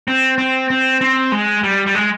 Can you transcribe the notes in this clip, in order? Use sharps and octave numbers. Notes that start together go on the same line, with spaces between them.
C4
C4
C4
C4
G#3
G3
G3
G#3